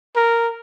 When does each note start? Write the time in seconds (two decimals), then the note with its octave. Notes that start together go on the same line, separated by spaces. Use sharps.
0.16 A#4